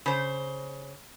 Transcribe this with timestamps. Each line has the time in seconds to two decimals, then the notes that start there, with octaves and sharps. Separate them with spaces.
0.06 C#3 C5